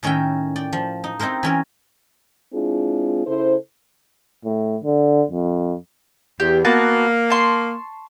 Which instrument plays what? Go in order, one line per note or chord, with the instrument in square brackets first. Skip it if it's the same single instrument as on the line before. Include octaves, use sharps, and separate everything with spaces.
[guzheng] A2 D#3 C#4 A#4 E5 G5
D5 G5
F3
D#4
C4 D#4 E4 A#4 C5
E3 C#4 A#4
[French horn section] G#3 C4 D4 E4 F4 G#4
C#3 E4 A4 C5
[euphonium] A2
D3
F2
[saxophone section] E2 [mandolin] G4
[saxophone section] A#3 [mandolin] B3 F#4 A5
[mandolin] A5 C6 C#6